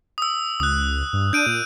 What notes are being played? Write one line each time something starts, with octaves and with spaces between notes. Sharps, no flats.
D#6 E6
C#2 D#6 F#6
G2
D4 G6 D7 D#7
A#2